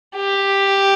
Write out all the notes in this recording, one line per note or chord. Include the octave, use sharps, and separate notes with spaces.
G4